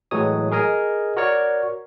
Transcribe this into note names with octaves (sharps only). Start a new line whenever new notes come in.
A2 E3 F#3 G#3 C#5 D#6
G#4 A#4 D#5 G#5
F#4 A#4 C#5 D5